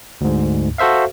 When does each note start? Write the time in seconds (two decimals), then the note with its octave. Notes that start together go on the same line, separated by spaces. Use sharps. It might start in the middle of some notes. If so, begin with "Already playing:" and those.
0.21 D2 G#2
0.78 F#4 A4 C5 E5 F5